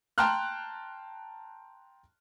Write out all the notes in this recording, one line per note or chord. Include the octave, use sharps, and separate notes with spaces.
G5 A5 A#5 C6 F6 F#6